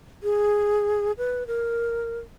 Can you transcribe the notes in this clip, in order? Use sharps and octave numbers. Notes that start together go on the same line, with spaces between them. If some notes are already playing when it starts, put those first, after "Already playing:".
G#4
B4
A#4